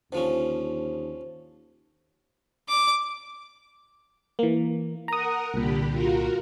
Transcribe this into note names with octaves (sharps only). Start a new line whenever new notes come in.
D#2 D3 F3 C#4 C5
D6
E3 A#3
A#4 F#5 A#5 D#6
C2 A#2 D3 G4 B5
F4 F#4 A#4